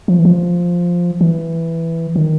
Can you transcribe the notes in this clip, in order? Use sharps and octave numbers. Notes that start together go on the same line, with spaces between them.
F3
E3
F3
E3
D#3